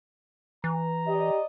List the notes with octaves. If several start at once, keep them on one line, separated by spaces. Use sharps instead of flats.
E3 A#5
G4 D5 D#5